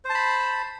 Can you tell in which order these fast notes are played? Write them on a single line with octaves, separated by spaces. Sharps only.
C5 A5 B5